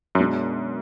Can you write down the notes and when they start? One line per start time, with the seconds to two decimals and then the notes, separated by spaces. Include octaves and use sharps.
0.15 F#2
0.20 B2 G#3 D4